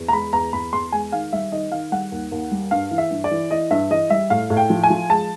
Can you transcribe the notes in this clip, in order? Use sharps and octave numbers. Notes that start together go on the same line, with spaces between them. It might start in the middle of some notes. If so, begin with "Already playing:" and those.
Already playing: E2
A#5
G#3 B5
E2 A#5
E2 B5
E2 C6
G#3 G#5
D#3 F5
G3 E5
D#3 D#5
D#3 F5
G3 F#5
D#2
D#2
G3
G2 F5
E3
E5
G2
D5
E3
E3 D#5
G2 E5
E3 D#5
G3 E5
A2 F5
A2
G5
F3
G#5
F3
G#3 A5